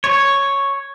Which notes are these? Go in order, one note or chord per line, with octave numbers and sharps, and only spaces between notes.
C#5